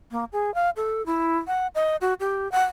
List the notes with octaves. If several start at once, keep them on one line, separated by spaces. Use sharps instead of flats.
A#3
G#4
F5
A4
E4
F#5
D#5
F#4
G4
F#5